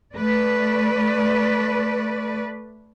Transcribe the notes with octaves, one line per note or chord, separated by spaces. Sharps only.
A3 B4 D5